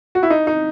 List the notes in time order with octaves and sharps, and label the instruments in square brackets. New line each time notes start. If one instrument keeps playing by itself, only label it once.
[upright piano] F#4
E4
D#4
D#4